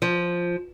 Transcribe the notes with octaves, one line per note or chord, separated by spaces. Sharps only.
F3